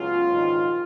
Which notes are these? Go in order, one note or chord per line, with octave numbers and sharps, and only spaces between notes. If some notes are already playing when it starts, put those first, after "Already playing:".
Already playing: C#2 C#3 F#3 B3 F4
A#1 G#2 D#3